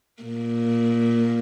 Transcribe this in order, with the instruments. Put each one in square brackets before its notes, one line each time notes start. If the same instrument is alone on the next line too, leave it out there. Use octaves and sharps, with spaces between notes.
[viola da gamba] A#2